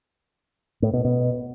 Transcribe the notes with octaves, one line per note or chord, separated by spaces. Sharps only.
A2
B2
B2